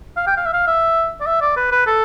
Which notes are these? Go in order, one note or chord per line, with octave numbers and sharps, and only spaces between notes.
F5
G5
F5
E5
F5
E5
D5
E5
D5
B4
B4
A4